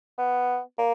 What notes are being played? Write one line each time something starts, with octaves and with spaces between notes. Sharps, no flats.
B3
A#3